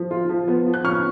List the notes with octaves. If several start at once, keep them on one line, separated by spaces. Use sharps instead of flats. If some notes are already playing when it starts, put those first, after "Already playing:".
Already playing: F3
F4
F3
B3
F3
F#6
C#4 C#6 F6